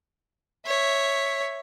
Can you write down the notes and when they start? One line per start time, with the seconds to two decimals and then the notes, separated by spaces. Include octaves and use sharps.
0.66 C#5 E5